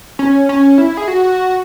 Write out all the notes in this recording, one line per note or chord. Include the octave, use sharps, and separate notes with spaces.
C#4
C#4
E4
G#4
F#4